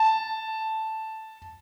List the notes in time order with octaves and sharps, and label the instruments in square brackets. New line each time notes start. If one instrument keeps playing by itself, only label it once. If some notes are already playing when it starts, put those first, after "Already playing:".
Already playing: [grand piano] A5